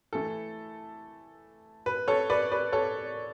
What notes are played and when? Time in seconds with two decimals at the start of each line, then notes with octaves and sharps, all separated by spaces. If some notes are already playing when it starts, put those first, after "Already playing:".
0.13 E3 A3 E4 A4
1.86 B4
2.08 A4 C#5
2.30 B4 D5
2.52 B4 D5
2.72 A4 C#5